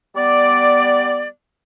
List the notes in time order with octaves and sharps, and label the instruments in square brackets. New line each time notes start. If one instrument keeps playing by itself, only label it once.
[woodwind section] G3 B3 D5